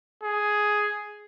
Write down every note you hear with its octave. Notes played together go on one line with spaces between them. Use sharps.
G#4